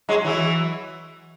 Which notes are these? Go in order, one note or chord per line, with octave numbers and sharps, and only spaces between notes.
F#3 G#3
E3 F#3